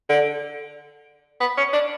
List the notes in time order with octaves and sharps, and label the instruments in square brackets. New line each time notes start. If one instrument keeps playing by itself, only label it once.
[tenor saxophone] D3
B3
C#4
D4